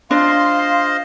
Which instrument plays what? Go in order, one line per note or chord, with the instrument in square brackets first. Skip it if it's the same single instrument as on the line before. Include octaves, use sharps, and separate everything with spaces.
[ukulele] D4 [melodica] F4 C5 D#5 [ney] F5 [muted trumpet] C6